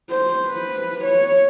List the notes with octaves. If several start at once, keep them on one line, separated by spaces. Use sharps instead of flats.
C5
B4
C#5